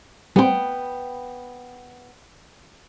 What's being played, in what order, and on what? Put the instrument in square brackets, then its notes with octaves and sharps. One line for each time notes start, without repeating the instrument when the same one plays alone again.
[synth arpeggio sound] G3 C4 [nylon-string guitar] B3 G5